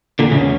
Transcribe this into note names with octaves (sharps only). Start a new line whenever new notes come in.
E2 A#2 D3
A2 C#3
C#4